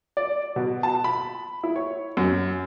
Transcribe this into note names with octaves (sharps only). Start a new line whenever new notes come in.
D5
B2
A5
B5
E4
C#5
F#2